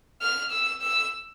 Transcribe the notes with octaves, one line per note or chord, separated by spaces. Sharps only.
F6
E6
E6